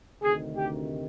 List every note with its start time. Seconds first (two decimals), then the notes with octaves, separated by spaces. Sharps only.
0.22 D2 C3 D#3 G#4
0.56 G4